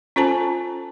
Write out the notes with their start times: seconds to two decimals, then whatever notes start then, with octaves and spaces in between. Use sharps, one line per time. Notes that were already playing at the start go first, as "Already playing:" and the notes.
0.16 C#4 F4 A4 C5 G#5 A5